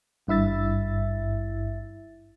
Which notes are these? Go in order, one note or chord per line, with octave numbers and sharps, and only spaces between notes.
G#1 G2 E4 E5 A6